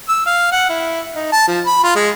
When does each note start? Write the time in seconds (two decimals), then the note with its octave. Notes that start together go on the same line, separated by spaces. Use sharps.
0.09 E6
0.26 F5
0.52 F#5
0.69 E4
1.16 D#4
1.32 A5
1.48 F3
1.66 B5
1.84 F4
1.96 G#3